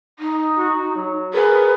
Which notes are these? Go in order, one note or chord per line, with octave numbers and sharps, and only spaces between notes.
D#4
F#4
F#3
G#4 A#4 B4